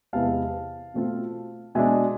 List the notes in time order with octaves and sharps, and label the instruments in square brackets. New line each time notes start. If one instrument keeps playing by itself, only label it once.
[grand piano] E2 C3 G#3 B3 E4 F5 A5
B2 A3 C4 F4
B2 G#3 D4 E5 G#5